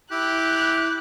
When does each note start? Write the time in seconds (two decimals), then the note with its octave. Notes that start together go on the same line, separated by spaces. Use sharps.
0.12 E4 G4 D6 F#6